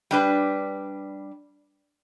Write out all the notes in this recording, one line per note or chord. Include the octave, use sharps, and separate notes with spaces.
G3 D4 B4